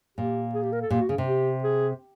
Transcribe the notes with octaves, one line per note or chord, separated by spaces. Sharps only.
A#2 G4
G#4
G4
A#4
A4
A#2 G4
F#4
C#3 G#4
C3
G4
G#4